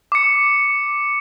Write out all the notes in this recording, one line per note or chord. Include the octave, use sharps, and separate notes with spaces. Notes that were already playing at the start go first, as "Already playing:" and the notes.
D6 C#7